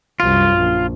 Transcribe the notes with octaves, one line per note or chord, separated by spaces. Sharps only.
C2 F#2 F4
A#1